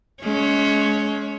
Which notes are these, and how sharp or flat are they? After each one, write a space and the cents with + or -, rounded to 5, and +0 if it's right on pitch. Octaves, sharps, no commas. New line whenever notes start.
G#3 +35 C#4 +35 C#5 +0